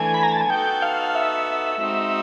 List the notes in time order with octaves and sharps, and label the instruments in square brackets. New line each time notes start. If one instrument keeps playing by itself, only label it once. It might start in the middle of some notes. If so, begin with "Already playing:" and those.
Already playing: [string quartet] E3 A3 D4 [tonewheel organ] G#5
[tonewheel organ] B5
A#5
A5
G#5
[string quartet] B3 D#4 F#4 A4 [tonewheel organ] G5
[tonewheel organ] F5
E5
[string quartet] G#3 C4 D#4 F#4